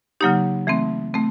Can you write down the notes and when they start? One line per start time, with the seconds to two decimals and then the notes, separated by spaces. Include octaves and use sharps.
0.21 C#3 F#3 A#3 D#4 G4
0.67 E3 A3 C4
1.14 A3 C4